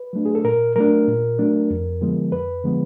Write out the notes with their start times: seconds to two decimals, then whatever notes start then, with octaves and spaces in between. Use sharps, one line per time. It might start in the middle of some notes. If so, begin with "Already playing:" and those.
Already playing: B4
0.13 F#3 A3 D4
0.25 G#4
0.35 A4
0.44 A#2 A#4
0.76 F#3 A3 D4 A#4
1.08 A#2
1.39 F#3 A3 D4
1.70 F2
2.01 D3 F3 G#3 B3
2.32 F2 B4
2.64 D3 F3 G#3 B3